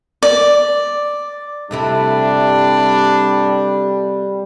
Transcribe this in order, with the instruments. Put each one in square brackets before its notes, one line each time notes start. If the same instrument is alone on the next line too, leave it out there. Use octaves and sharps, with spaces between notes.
[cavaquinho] D5
[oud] C3 A3 E4 [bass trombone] G3 [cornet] D4